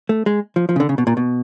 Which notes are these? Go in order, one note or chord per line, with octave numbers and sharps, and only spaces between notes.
A3
G#3
F3
F3
C#3
D3
C#3
B2
A#2
B2